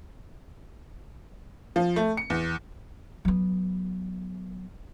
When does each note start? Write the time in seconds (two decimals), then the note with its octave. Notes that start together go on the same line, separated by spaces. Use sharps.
1.76 F3
1.96 A3
2.17 C#7
2.30 E2
3.25 F#3 B3